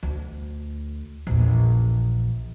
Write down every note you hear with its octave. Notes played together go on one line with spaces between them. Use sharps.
D2
A#1 E2